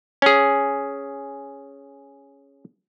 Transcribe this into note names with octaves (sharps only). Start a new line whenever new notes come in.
C#4 G#4